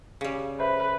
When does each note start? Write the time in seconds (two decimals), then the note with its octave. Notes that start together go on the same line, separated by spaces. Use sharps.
0.21 C#3 G3
0.60 B4 C5 E5